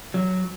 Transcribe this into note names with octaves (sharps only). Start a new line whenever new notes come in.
F#3